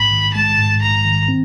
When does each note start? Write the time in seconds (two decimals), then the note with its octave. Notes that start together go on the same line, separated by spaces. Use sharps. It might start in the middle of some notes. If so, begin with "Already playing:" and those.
Already playing: A#1 G#2 G#3 B5
0.10 D#3
0.34 G#3 A5
0.58 G#2
0.82 A#1 A#5
1.05 D#3
1.28 C4